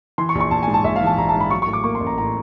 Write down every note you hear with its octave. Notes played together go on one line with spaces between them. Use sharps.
E3 C6
C#6
A#1
C#6
A#1 A5
G#2 G#5
A5
A#1 E5
F5
E3
A5
A#1 A#5
A5
G#2
B5
F#3 C#6
A2 C#6
D6
A#3 C#6
C6
A1
A#5
A2 A#5